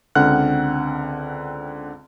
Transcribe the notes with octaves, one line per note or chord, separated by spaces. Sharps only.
C#2 D3 C4 F#5 F6 F#6